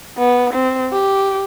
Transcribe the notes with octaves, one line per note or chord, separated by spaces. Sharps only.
B3
C4
G4